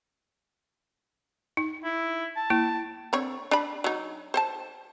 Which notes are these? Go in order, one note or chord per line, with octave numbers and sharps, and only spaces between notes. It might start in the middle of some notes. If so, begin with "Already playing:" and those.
D#4
E4
A5
A#3 E4
D3 C4 C#5
D4 B5
F#3 D#4
C5 F#5 A5